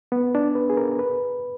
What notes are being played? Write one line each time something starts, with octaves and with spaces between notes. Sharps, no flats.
B3
D4
B4
G#4
A#4
B4